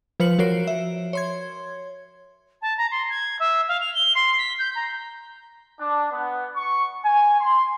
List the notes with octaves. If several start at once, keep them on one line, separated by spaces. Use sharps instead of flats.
F3 B4 C5 F6 C#7 F#7
F3 F#4 A#4 C#5 C7 D7
E5
C#5 C6 G#6
A5
A#5
C6
G#6
E5
F5
F7
G7
C6
B6
G6
A#5
D4
B3
C#6
G#5
C6